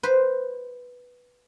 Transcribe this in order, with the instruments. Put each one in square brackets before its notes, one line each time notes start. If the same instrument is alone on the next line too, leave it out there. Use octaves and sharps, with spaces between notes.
[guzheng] B4 C5